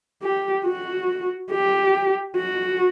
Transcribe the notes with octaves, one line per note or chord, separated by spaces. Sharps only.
G4
F#4
G4
F#4